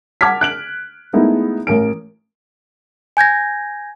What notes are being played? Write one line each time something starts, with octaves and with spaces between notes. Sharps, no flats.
F#5 A5 D6 F6 G#6 B6
F#6 D7 F#7
G#3 A3 B3 D#4 E4
A1 A#4 D7
G#5 G6 G#6 A#6